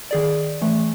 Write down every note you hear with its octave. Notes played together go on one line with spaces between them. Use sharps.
D#3 G#4 D5
E3 A3